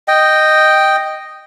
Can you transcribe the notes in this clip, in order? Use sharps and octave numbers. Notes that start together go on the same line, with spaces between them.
D#5 G5